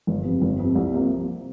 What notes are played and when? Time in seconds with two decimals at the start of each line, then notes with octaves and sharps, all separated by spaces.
0.07 G1
0.24 F2 C3
0.42 G1
0.59 F2 C3
0.75 C2
0.93 C3 F3 A#3